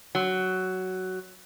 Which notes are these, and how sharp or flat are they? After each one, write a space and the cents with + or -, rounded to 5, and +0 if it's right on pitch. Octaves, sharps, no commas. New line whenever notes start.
F#3 +10